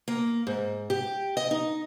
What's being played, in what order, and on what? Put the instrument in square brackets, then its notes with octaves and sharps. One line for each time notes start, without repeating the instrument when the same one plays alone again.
[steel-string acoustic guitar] A#3
G#2
G4
D#5
D#4